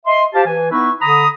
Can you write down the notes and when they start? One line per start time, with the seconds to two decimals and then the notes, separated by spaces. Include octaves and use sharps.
0.06 D#5 E5 C6
0.34 G4 C5 F5 A5
0.46 E3 G#5
0.71 B3 D#4 E4 B4 C#6
1.01 D3 A#5 B5 D#6